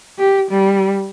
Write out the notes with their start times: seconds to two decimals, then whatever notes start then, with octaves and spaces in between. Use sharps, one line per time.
0.19 G4
0.51 G3